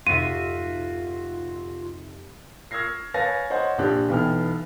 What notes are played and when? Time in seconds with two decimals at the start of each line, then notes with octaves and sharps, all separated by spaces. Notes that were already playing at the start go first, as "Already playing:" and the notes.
0.07 F2 G#2 C3 F4 F#4 E5 D#7
2.71 C#6 E6 F6 G#6 A#6 C7
3.14 B4 C#5 F5 G#5 A6 A#6
3.50 C5 C#5 D#5 F#5 C6
3.78 A#1 D4 G4 F#6
4.08 B1 E3 B3 G5 F6